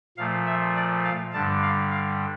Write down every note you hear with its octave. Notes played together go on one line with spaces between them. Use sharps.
A#2 F3 A3 F5
E5
D5
F5
G2 D3 G3 A5
F5
F5